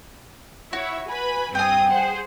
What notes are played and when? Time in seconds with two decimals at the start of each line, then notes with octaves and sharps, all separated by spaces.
0.73 E4 F#4 C#5 E5
1.08 B4 G#5 B5
1.55 G2 C4 G5 G#5 D#6
1.89 G#4 C5 F#5